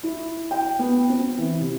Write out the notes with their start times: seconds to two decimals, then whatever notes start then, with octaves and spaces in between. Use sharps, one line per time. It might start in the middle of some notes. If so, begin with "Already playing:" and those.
0.03 E4
0.51 G5
0.79 B3
1.09 C4
1.38 E3
1.61 C3